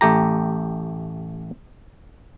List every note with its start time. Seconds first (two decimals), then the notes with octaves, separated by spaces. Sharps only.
0.01 A1 A3 G4 A#5